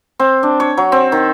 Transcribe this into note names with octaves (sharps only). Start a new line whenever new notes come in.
C4
D4
C#5
F#3
C4
D#3